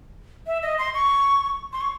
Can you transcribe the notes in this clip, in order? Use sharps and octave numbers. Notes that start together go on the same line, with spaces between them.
E5
D#5
C6
C#6
C6
C#6